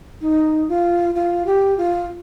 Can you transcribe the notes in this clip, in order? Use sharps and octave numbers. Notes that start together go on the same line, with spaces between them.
D#4
F4
F4
G4
F4